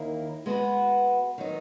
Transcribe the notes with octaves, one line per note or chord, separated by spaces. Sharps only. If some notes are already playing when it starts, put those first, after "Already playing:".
Already playing: D#2 D#3 A#3 E4
G#3 B3 F#4 B4
D#3 F#3 B3 D#4